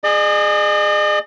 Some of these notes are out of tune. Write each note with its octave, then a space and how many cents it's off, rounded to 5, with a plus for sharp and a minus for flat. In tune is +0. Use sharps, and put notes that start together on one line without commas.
G#4 +0 D#5 -45